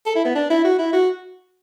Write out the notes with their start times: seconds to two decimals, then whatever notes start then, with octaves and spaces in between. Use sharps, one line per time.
0.06 A4
0.16 E4
0.25 B3
0.35 D4
0.50 E4
0.64 F#4
0.79 E4
0.93 F#4